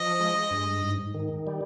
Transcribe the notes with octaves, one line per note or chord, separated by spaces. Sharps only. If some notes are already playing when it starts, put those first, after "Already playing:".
Already playing: F3 D#5
G#3
G2
G#2
D#3
G3